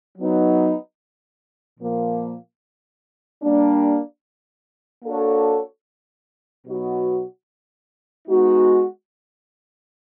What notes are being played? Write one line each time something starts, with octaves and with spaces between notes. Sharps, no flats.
F#3 B3 D#4
A#2 F3 A#3
G3 A#3 D4
A#3 D4 F#4 A4 C#5
B2 F#3 B3 D#4 F#4
G#3 B3 D#4 F#4